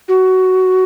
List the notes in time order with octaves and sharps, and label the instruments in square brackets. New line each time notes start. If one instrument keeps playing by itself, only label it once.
[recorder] F#4